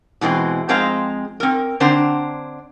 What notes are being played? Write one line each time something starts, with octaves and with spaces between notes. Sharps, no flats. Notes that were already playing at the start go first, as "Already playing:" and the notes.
B2 E3 G#3 C4
F2 G#3 C4 C5 F5 A#5
C4 A#4
D3 C4 D4 C5 A#5